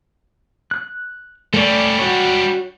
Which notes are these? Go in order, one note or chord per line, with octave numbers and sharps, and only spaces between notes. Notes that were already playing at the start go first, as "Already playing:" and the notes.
F#6
G3 A3 C#4 D5
F#4 C#5